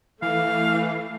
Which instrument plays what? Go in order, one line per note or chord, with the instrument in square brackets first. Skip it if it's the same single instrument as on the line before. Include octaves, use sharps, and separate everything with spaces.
[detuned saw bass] E3 [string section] A3 [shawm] F5